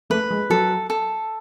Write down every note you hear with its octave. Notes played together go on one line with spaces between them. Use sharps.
A3 B4
G#3
F#3 A4
A4